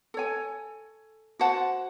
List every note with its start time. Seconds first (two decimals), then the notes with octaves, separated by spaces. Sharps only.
0.14 A4 C#5 G#5
1.39 F#4 C5 F#5 A5